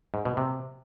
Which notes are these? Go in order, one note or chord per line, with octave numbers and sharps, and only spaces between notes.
G#2
B2
C3